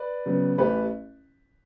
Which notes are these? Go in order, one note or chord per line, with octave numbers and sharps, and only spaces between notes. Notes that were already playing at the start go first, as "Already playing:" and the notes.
Already playing: B4 D5
C#3 F#3 B3
A1 G4 B4